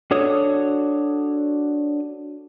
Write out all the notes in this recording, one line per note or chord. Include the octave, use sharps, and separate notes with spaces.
D4 F#4 A4 C#5 D#6